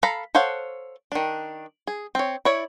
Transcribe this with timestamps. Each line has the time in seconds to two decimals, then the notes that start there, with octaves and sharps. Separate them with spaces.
0.03 A4 F5 A#5 B5
0.35 A4 C5 C#5 F5 F#5
1.12 D#3 D4
1.87 G#4
2.15 C4 C#5
2.45 E4 C#5 D5